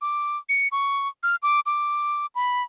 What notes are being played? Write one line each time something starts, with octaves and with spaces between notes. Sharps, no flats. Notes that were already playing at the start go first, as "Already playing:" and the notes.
D6
C#7
C#6
F6
D6
D6
B5